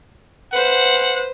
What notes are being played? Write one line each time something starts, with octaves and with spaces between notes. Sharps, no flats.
B4 C5 F#5